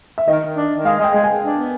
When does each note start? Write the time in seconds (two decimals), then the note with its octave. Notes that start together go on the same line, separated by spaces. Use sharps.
0.18 E5
0.28 D#3 D#5
0.42 D#3
0.56 D4
0.71 D#3
0.85 G#3 F5
1.00 G#3 G5
1.13 G#3
1.24 G#3 G#5
1.43 D4
1.57 B3